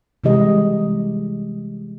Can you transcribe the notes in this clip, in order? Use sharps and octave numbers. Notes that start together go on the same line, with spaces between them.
C3 E3 G3 G#3 G4 D#5